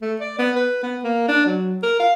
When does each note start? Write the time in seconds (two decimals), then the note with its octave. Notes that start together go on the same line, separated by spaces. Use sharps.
0.02 A3
0.20 D5
0.39 B3
0.56 B4
0.83 B3
1.04 A#3
1.28 D4
1.46 F#3
1.83 A#4
2.00 F5